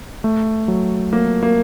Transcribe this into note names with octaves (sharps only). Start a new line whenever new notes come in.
A3
F#3
F#3 A#3
A#3